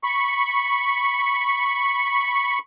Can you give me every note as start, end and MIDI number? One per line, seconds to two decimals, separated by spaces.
0.04 2.58 83
0.04 2.58 85